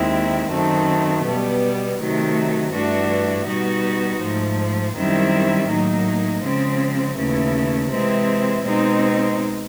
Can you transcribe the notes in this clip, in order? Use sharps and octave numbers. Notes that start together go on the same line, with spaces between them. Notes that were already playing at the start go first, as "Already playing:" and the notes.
Already playing: D#2 D#3 G#3 C4 E4
F#2 D#3 F#3 A3 C4
B2 G3 B3
C3 D#3 F#3 A3
G2 E3 A3 D4 F#4
B2 G3 B3 D#4 F#4
G#2 F3 A3
F#2 D#3 G3 C4 E4
A2 F#3 A#3 D#4
C#3 F3 G#3 C4
D#2 C#3 E3 A3
C3 E3 G#3 C4
B2 G#3 C4 D#4